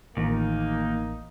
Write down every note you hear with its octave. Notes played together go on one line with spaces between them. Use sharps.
A1 D#2 A#3 D#4